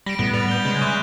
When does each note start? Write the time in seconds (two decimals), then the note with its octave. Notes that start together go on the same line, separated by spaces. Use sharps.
0.06 G3 B5 A#6 D7
0.19 A2 B3
0.34 G3 B4 A6 F7
0.48 G6 F7 G7
0.65 C#3 G#3
0.82 E5 C#6 F#6 G6